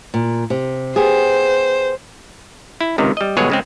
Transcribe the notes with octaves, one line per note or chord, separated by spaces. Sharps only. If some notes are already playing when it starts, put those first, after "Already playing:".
A#2
C3
B3 G4 G#4 C5
E4
C#2 C3 D#3
G3 D#5
G1 B2 F#3 G#3 G#4 C#5
C#3 G#3 C4